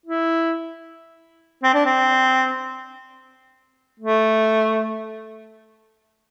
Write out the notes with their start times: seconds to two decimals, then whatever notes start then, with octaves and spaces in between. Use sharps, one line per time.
0.06 E4
1.64 C4
1.74 D4
1.85 C4
4.00 A3